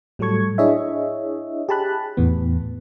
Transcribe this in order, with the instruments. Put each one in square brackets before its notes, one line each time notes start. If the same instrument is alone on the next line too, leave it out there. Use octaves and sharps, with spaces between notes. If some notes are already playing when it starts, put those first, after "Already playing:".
[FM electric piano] A2 F#3 G3 A4 C#6 G#6
D4 E4 G#4 C#5 D#5 E5
G4 G#4 A5 B5 F#6
E2 A2 E3 B3